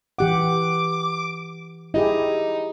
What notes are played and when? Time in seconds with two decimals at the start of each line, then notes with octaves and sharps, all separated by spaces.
0.18 E3 G4 F#5 D6
1.94 D#4 E4 G4 G#4